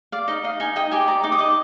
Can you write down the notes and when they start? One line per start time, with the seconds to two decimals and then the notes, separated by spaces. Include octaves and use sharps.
0.12 D5 F5
0.28 D#4 D#5
0.44 D#5 F5
0.60 D#4 G#5
0.76 D#5 G5
0.91 G4 G#5
1.08 D5 A#5
1.23 D#4 D6
1.32 D#6
1.39 D#5 D6